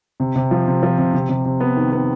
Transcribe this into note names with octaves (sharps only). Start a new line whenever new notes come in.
C3
C3
F3
C3
F3
C3
C3
C3
C3
B3
D#3
B3